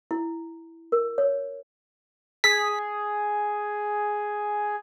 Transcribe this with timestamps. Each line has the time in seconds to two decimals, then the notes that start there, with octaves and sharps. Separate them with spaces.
0.11 E4
0.92 A#4
1.18 C#5
2.44 G#4 B6